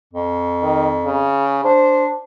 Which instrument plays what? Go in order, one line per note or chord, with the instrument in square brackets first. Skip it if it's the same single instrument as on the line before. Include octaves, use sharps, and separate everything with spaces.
[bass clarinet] F2
[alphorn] D#3
C#3
[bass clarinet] D4 [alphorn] C5